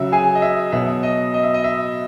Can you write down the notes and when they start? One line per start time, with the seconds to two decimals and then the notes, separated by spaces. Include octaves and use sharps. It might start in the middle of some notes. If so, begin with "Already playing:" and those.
Already playing: C#3 F#3 E5
0.12 G#4 G#5
0.35 D#5
0.42 E5
0.72 B2 F#3 E5
1.03 D#5
1.34 D#5
1.43 E5
1.54 D#5
1.64 E5